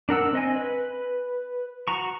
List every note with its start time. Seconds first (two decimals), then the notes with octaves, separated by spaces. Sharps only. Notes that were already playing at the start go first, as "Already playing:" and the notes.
0.09 D4 A#4 F#5 E6
0.33 C4 D#5 G#5
0.56 B4
1.88 F#4 A#5 C#6